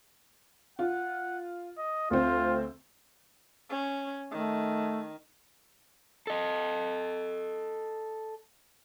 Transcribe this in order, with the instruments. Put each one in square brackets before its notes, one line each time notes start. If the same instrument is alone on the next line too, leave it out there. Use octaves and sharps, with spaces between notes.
[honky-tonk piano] F4 [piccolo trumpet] F#5
[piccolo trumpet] D#5
[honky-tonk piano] D2 C4 [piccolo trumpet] F4
[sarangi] C#4
[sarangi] D#3 [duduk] A3
[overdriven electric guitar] A4 D#5